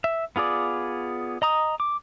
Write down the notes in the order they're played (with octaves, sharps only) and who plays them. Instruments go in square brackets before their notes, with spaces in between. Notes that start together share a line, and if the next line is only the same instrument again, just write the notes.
[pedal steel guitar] E5
B3 F4 G#4 D5
D#5 A#5 D#6
D6